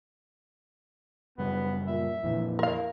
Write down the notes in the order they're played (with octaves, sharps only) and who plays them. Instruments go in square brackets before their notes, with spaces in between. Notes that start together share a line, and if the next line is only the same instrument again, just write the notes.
[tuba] E1 [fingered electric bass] F#2 C#3 G3 [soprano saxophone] B3
[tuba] A#2 [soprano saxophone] E5
[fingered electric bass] F2 A#2 D3 [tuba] E3
[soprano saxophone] A#3 [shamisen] A#4 F5